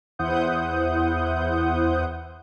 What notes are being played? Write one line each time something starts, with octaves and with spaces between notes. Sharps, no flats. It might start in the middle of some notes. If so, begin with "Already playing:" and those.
E2 E4 C5 F#5 D#6 G6